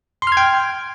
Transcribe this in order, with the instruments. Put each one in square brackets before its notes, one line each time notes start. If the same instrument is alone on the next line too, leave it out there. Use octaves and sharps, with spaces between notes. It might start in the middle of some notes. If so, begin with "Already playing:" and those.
[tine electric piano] C6
F6
G#6
G5